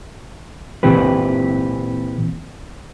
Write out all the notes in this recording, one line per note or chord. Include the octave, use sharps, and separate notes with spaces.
A#2 E3 C4 G4 B4